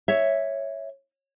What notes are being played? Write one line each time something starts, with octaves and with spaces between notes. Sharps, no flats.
C#5 E5